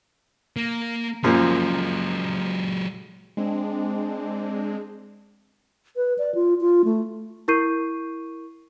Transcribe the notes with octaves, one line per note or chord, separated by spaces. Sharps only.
A#3
F#2 A#2 F3 F#3 G#3
G#3 C4 D4
B4
D5
F4
F4
A3
E4 A#4 C#6 G6 C7 D#7